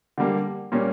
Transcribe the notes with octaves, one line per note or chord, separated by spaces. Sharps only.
D3 G3 A#3
A#2 G3 A#3 C#4